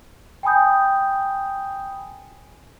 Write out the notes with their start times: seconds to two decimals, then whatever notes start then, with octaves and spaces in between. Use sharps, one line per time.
0.43 G5 G#5 B5 D#6 G6